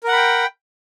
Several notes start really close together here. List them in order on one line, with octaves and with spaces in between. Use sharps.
A#4 F#5 B5 G5